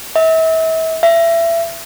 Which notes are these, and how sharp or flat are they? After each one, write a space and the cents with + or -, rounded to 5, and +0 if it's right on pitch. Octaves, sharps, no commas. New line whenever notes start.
E5 -35
E5 +25